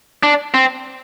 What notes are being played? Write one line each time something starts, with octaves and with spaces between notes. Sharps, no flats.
D4
C4